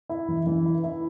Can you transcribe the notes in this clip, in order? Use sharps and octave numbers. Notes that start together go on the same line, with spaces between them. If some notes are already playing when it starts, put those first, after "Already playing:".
E4
E3
E3
E4
E4